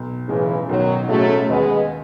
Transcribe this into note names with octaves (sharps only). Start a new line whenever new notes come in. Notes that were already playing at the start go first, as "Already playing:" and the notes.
Already playing: B1
A2 C#3 E3 G#3 C#4
B1 D#3 F#3
A2 F#3 G#3 A3 C#4
D#2 G#3 B3